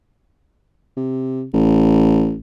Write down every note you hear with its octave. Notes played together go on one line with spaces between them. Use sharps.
C3
A1